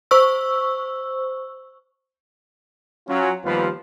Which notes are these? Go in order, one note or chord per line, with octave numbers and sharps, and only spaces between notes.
C5 C#6 E6
F#3 C#4 F4
D#2 F3 G3 B3 F4 B4